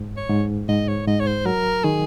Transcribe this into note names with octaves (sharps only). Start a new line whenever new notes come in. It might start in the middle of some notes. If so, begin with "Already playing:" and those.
Already playing: G#2
C#5
G#2
G#2 D#5
C#5
G#2 D#5
C#5
C5
F#3 A#4
D#3 G#4